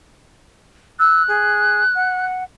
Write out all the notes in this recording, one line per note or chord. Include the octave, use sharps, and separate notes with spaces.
E6 F#6
G#4
F#5